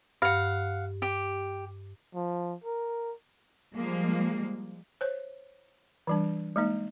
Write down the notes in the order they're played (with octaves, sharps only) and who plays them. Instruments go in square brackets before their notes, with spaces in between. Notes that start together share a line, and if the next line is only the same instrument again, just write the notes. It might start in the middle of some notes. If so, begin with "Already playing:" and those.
[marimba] G2 [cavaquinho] F5 F#5
[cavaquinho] G4
[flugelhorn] F3
A#4
[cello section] F3 G3 G#3 A#3
[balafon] C5 C#5
E3 G3 D4
G#3 A#3 D#4